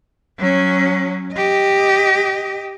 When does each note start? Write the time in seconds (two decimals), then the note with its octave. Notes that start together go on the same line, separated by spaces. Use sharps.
0.38 F#3 C#4
1.33 G4 D#5